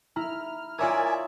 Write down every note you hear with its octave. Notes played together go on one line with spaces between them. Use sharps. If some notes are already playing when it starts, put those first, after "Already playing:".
E4 A#5 F6
F4 A#4 C#5 D5 E5 G#5 D#6